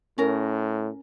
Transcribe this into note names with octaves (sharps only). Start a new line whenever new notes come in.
A2 C#4 A#4